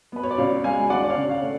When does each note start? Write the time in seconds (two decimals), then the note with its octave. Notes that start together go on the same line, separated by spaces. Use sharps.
0.12 B3 B4
0.23 C#5
0.31 D5
0.38 C#2 C#5 F5
0.64 G#3 F5 G#5
0.90 D4 D5 F#5
1.04 D5
1.10 C#5 F5
1.16 C#3
1.29 C#5 F5
1.42 A3